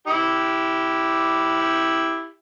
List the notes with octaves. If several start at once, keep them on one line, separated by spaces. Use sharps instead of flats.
E4 G4